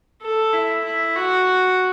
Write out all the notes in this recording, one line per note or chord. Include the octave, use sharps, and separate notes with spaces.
A4
E4
E4
F#4